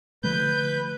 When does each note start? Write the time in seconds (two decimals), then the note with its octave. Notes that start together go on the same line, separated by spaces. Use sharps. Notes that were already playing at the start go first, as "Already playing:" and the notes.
0.24 D3 F3 A3 B4 G6